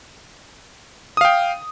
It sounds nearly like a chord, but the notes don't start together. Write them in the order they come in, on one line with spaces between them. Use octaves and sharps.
D#6 F5 G5